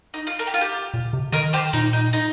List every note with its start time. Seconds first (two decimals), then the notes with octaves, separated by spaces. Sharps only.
0.14 D#4
0.27 F4
0.39 A#4
0.47 G4
0.54 F4
0.61 G4
0.94 A#2
1.13 C3
1.32 D#3 A#4 D#5
1.53 G4 C5
1.73 A#2 D#4
1.93 D#4
2.13 D#4